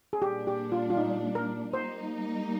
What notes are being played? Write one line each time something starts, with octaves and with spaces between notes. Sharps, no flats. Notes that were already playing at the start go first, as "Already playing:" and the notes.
G#4
A#2 G3 D4 G4
G4
F4
F4
D#4
A#4
G3 A#3 D#4 C5